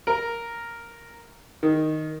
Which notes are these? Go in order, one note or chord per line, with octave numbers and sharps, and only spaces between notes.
A#4
D#3